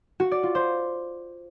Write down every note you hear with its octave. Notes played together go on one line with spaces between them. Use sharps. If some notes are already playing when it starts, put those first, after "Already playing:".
F#4
D5
F4
C5